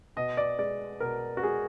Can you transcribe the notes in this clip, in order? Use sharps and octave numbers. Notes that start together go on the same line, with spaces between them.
B2 D#5
D5
G#3 D5
B2 A#4
F#4
G#3 G#4